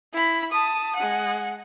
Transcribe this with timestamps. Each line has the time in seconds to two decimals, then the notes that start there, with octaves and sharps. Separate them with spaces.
0.13 E4 B5
0.52 A5 D#6
0.96 G#3 F#5